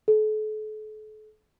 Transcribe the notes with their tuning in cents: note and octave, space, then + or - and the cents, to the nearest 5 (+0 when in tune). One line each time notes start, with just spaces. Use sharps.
A4 -40